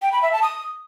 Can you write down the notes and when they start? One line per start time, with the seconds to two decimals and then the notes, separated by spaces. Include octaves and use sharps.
0.02 G5
0.12 B5
0.22 E5
0.33 A5
0.43 D#6